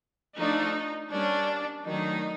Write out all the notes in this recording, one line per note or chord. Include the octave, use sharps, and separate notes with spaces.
F3 A3 D4 D#4
G3 A#3 C#4 D4
D#3 F#3 A3 D4 D#4